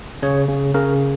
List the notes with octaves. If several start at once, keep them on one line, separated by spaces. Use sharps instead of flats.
C#3 C#5
C#3
C#3 A#4